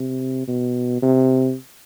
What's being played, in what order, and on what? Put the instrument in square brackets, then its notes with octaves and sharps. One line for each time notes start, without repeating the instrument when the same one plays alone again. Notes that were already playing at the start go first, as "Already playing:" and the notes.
Already playing: [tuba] C3
B2
C3